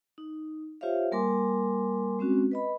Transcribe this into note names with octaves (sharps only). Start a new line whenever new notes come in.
D#4
F4 G4 C5 C#5 E5 F5
G3 A#3 A#4 G#5 C6 D6
G#3 C4 C#4 F#4
B4 D#5 B5